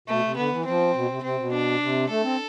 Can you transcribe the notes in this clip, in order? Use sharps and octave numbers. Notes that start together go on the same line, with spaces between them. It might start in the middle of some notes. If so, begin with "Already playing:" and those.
B2 A3
C3
D3 B3
E3
F3 C4
B2
C3
C3 C4
B2
D4
C3
A3 A4
C4